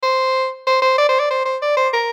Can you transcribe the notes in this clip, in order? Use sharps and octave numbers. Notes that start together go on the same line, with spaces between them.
C5
C5
C5
D5
C5
D5
C5
C5
D5
C5
A#4